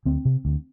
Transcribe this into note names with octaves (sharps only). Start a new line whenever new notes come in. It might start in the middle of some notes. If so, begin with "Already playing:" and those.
D2 C4
C3
D2